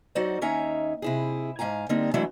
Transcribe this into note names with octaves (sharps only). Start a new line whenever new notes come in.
F#3 D#4 F#4 C5 D5
D#2 C#4 D#4 E5 G#5 A#5
C3 E4 G#4
G#2 F5 G#5 A#5
D3 G3 A#3 C4 D#4
E3 F#3 G#3 A3 D4 E4